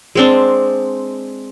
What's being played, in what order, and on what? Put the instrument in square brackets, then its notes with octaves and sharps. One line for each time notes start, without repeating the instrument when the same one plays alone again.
[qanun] G#3 C4 D4